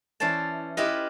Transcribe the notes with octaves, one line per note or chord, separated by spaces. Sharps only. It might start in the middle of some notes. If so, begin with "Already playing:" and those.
E3 C#4 C5 D5 A5
E4 F4 G4 B4 D#5